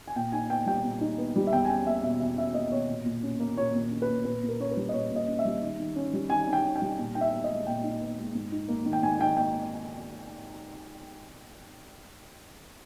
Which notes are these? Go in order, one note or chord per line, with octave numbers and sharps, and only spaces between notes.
G#5
A#2 G5
D#4 G#5
B3 G5
G3 G5
A#2
D#4
B3
G3
E5
E2 G5
G#5
C#4 G5
A#3 E5
B2 E5
E2 E5
C#4 E5
A#3 D#5
B2 C#5
A#2
A#2
C#4
A#3
A#2 C#5
A#2
C#4
B4
A#3
A#2 B4
A#2
A#4
C#4 C#5
B4
G3
D#5
A#2 C#5
A#2 D#5
C#4
E5
G3
D#3
D#3
C#4
G3
D#3 G#5
D#3
G5
C#4
G5
G3
A#2
D#4 G5
E5
B3
D#5
G#3
A#2 G5
D#4
B3
G#3
G#2
D#4
A#3
D#3
G5
G#2 G#5
D#4 G5
A#3 G5